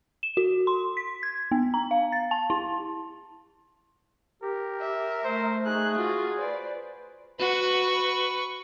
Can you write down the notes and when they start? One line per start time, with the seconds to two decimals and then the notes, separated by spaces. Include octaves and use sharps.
0.23 E7
0.37 F#4
0.67 C6
0.97 B6
1.23 G#6
1.51 B3
1.74 A#5
1.91 F5
2.12 A6
2.31 A5
2.50 E4
4.42 G4 A#4
4.80 E5
5.25 A3 C5
5.66 D#4 G#4 F#6
5.98 F4 F#4
6.38 B4 C5 D5
7.39 F#4 B4 C#6